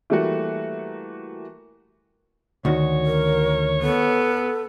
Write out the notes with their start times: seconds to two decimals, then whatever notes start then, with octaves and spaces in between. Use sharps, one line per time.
0.10 E3 G3 A3 A#3 F#4
2.65 D2 D#3 F#4 C#5
3.06 A#4
3.82 B3 A4